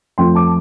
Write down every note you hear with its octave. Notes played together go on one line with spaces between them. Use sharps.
F2 F3 A3 G5 C6
A5 D6